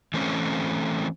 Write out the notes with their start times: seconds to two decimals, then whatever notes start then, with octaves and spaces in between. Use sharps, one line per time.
0.14 E3 A3 C4 C#4